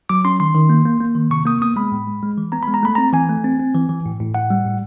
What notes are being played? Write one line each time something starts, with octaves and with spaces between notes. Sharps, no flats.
F#3 D6
C#4 C6
D#3 C6
D#3
A#3
A#3
A#3
D#3
C3 C#6
A#3 D#6
B3 D#6
G#3 B5
A2
G#3
G#3
E3
B3 A#5
G#3 B5
A#5
A3 B5
C4 A#5
E3 G#5
A3
C4
C4
E3
E3
A2
A2
A2 F#5
G3
A2